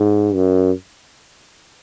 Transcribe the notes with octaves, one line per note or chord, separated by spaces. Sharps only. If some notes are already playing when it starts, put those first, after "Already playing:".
Already playing: G#2
F#2